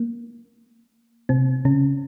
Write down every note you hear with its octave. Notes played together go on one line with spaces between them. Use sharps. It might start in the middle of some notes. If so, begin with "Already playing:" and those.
Already playing: A#3
C3 C4
C#3 C#4